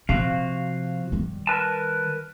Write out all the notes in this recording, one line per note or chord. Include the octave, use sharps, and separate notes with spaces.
C3 F3 F#4 F5
D#3 G3
A#4 B4 A5